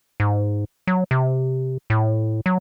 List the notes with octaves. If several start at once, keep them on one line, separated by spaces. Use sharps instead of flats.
G#2
F#3
C3
A2
F#3